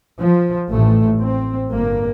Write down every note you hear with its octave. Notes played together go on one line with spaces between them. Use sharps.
F3
A1 A2 A3
C4
G1 G2 A#3